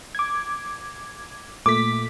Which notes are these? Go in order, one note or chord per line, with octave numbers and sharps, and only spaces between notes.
D6 G#6
A#2 A3 D6 B6